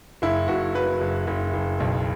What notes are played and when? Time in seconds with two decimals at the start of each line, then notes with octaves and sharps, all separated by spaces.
0.22 F#1 E4
0.48 F#1 F#4
0.75 F#3 B4
1.01 F#1
1.27 F#1
1.53 F#1
1.80 B1